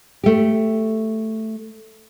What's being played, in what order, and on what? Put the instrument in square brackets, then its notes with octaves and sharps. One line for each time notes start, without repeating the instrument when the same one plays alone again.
[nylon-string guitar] A3 G4